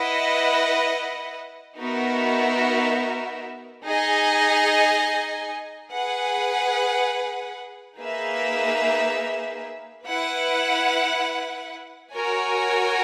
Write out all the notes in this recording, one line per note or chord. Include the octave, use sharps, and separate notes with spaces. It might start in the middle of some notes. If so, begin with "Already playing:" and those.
Already playing: E4 B4 D#5 F#5
B3 D#4 F#4 A#4 E5
D#4 G#4 D#5 G#5
G#4 B4 F#5
A#3 D#4 G#4 B4 E5
E4 B4 F#5
F#4 A#4 C#5 G#5